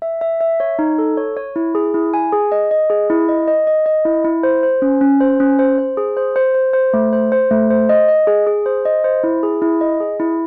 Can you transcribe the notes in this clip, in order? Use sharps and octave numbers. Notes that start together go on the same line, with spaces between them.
E5
E5
E5
C#5
D#4
A4
C#5
C#5
E4
G#4
E4
G#5
G#4
D#5
D#5
G#4
E4
D#5
D#5
D#5
D#5
E4
E4
C5
C5
C#4
C#4
C5
C#4
C5
C5
G#4
C5
C5
C5
C5
A3
C5
C5
A3
C5
D#5
D#5
G#4
G#4
C5
D#5
C5
E4
G#4
E4
D#5
G#4
E4